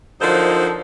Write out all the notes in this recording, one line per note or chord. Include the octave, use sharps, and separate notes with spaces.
D3 F3 F#3 D#4 A#4 C5